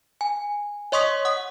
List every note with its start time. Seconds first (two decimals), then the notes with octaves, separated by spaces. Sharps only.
0.21 G#5
0.92 C#5 D#5 C6 C#6 D#6 B6
1.25 F#5 D#6